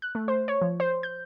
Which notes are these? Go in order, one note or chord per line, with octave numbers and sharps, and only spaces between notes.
F#6
A3
C5
C#5
F3
C5
G6